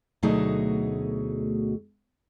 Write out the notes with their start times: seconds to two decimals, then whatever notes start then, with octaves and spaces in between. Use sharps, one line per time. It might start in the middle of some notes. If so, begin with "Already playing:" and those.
0.23 D2 B2 F#3 A3 D#4 G#4